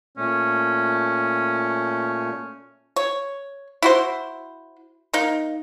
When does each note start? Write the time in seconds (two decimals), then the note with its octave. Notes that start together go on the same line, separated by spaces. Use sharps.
0.18 A#2 A3 C#4
2.96 C#5
3.82 E4 F#4 C5
5.14 A#3 D#4